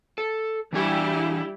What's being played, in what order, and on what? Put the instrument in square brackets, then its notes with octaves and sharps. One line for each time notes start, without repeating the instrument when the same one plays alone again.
[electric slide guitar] A4
[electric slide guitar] E3 D4 G#5 [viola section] G3 E4 G4